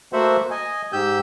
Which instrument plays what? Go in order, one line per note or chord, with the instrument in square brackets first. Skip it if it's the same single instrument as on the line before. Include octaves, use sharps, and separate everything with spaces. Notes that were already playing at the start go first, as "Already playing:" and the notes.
[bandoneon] A3 A#3 F#4 C5 E5 F#5
D#5 G#5
G#2 G4 E6 G6